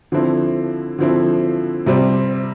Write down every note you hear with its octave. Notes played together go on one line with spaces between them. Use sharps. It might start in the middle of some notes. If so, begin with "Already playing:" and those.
D3 F3 C4 E4
D3 F3 C4 E4
C3 G3 C4